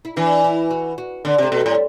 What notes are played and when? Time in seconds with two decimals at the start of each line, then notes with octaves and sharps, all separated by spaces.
0.05 E4
0.16 E3 D4
0.44 E4
0.71 F#4
0.98 F#4
1.25 D3 D4
1.38 C3
1.43 A3
1.52 B2
1.61 A2 G3